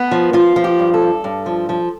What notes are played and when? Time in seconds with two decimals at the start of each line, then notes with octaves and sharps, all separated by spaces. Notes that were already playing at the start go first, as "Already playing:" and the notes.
Already playing: B3
0.11 F3
0.33 F3 F4
0.56 F3
0.64 G4
0.79 G2
0.94 A4
1.02 G2
1.24 G2
1.46 F3
1.69 F3